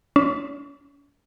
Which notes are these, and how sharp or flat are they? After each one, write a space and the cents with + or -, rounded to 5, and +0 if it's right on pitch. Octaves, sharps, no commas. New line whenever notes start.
C#4 +40